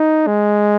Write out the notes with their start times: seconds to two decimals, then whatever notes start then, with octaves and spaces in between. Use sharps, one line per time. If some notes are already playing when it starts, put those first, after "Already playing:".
Already playing: D#4
0.27 G#3